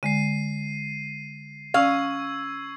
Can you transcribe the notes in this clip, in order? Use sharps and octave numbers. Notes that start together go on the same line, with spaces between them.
D3 G#3 C7 D#7
C#4 F5 C#6 E6 G#6